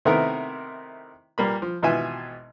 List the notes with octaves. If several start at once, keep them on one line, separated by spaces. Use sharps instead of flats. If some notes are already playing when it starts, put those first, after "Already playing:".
C3 D#3 A3 B3 E4 A#4
A#2 G3 A#3 B5
F3
G#1 B2 E3 F4 E5 G#5